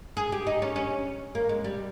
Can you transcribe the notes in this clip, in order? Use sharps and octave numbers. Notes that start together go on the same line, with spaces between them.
G#4
G4
D#4
C#4
C#4
A#3
G#3
G3